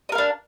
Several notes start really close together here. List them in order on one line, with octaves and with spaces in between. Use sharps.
D#5 A#4 F5 D4